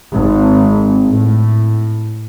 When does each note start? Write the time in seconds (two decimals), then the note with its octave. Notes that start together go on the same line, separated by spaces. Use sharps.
0.14 G#1
1.08 A2